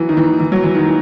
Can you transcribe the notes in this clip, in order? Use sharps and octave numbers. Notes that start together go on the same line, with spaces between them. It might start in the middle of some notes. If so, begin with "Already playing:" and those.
Already playing: E3 F#3
D#3
E3
E3
F#3
E3
D#3
E3